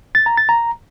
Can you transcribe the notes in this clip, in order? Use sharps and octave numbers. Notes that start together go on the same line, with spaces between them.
A6
A#5
A6
A#5